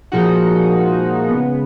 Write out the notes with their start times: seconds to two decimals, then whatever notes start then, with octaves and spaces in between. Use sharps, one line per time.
0.12 A#2 F3 G#3 D#4 F#4
1.28 C#3 G#3 B3